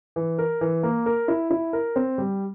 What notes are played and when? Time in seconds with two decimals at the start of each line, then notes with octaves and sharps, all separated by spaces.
0.16 E3
0.38 A#4
0.61 E3
0.83 A#3
1.06 A#4
1.28 E4
1.51 E4
1.73 A#4
1.96 C4
2.18 G3